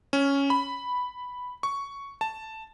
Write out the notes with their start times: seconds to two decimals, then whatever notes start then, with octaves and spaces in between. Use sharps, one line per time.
0.13 C#4
0.50 B5
1.63 C#6
2.21 A5